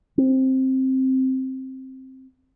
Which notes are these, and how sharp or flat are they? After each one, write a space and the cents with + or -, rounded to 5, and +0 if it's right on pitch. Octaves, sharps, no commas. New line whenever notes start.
C4 +10